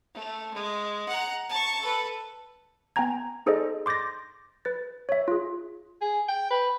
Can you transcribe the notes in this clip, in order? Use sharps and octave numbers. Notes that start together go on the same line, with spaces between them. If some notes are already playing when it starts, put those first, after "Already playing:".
A3
G#3
F#5 A#5
A5 C#6
A4 B4
B3 G5 G#5 A#5 G#6
D#4 G#4 A4 C5 D5 D#5
C6 D6 G6 A6 A#6
B4 A6
C#5 E5
F4 G#4
G#4
G5
B4